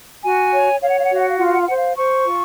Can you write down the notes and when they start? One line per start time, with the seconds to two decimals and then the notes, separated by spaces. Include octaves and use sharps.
0.23 F#4 G#5
0.53 C#5
0.81 C#5 F5
0.89 F#5
0.98 F5
1.05 F#5
1.10 F#4 F5
1.21 F#5
1.29 F5
1.37 F4 F#5
1.45 F5
1.53 F#5
1.60 F5
1.68 C5 F#5
1.76 F5
1.97 C5 C#6
2.26 F4